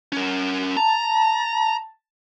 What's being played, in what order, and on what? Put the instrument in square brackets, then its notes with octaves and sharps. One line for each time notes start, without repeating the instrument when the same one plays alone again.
[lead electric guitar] C#4 A#4
[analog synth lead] A5 [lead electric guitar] A#5